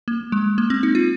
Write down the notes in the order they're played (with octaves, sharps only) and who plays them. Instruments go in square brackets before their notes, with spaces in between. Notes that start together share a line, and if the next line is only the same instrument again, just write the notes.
[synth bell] A#3
G#3
A#3
C4
D#4
F4